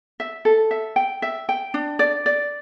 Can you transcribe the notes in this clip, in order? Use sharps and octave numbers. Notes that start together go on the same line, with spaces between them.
E5
A4
E5
G5
E5
G5
D4
D5
D5